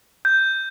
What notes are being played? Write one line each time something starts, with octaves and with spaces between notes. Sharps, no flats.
G6